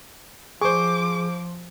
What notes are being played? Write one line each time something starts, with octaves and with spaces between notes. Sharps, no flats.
F3 G#4 C5 C#6 D6